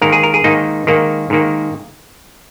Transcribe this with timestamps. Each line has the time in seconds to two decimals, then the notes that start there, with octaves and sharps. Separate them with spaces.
0.01 G#2 D#3 A#3 A#4
0.12 G#4
0.23 A#4
0.34 G#4
0.44 G#2 D#3 A#3 D#4
0.87 G#2 D#3 A#3
1.30 G#2 D#3 A#3